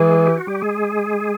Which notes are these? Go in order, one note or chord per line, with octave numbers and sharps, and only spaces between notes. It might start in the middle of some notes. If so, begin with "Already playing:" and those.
Already playing: E3 G#3 G#4
G4
F#4
G3 G4
G#3 G#4